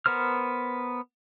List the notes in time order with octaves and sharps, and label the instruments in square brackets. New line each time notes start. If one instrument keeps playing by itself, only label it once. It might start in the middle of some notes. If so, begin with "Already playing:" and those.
[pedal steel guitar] B3 A#4 C5 F6